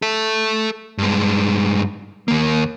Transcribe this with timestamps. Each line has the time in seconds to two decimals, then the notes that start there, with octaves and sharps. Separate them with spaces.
0.02 A4 E5
0.98 G2 G#3
2.28 D#2 A#3